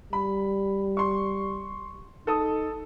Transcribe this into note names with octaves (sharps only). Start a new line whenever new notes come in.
G3 B5
C6 C#6
D#4 A4 D#6